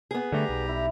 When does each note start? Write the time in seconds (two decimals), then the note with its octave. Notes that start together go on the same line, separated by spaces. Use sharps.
0.11 B3 G#4
0.32 D3 G3 A3 G4 A#5
0.49 B1
0.68 E4